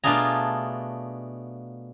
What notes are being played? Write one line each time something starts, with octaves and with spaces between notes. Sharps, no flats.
B2 A3 D4 F4 G#4 A#5